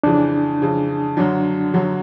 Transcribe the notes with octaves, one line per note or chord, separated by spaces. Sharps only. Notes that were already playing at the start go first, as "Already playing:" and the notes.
F2 C#3 E3 D4
F2 C#3 E3
F#2 D3 F#3 D4
F#2 D3 F#3